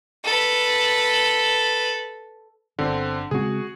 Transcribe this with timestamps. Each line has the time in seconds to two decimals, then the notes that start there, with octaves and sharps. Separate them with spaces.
0.24 A4 B4
2.79 G1 D3 C4
3.31 C#3 G#3 C4 F#4 G#4